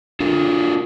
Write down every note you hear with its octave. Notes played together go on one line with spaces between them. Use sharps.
D4 F4 A4 A#4